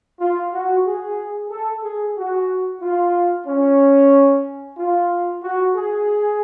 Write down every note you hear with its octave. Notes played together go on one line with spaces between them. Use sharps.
F4
F#4
G#4
A4
G#4
F#4
F4
C#4
F4
F#4
G#4